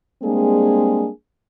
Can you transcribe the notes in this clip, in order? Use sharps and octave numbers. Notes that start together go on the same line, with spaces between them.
G3 G#3 A#3 C4 D4 G#4